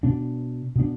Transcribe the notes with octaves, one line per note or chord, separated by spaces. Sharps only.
B2 B3 D4
B2 B3 D4